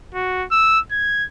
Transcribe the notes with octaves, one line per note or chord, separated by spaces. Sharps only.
F#4
E6
G#6